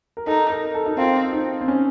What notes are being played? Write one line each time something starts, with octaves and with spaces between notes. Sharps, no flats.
A#4
D#4 A4
A#4
A4
D#4
C4 F4
D#4
C4
C#4